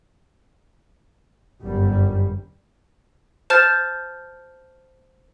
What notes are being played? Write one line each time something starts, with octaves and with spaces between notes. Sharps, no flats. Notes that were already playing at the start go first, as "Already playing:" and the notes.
G1 F#2 G3
C5 A5 F6 G6 A6